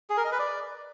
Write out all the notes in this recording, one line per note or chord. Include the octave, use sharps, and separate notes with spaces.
G#4
A#4
D#5
B4
D5